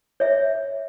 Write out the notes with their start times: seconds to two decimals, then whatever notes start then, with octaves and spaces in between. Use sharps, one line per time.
0.20 C#5 E5